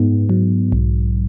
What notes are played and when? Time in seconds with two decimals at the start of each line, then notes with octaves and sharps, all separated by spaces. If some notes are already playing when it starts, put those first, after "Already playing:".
Already playing: G#2 B3
0.30 F#3
0.72 B1